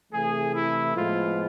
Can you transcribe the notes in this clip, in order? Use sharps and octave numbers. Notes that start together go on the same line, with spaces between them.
C3 E3 A3 G#4
E4
A2 F3 G#3 B3 F4